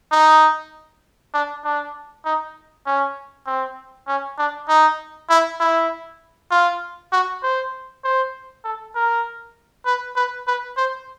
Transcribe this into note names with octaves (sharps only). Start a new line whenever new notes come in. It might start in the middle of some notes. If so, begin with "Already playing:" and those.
D#4
D4
D4
D#4
C#4
C4
C#4
D4
D#4
E4
E4
F4
F#4
C5
C5
A4
A#4
B4
B4
B4
C5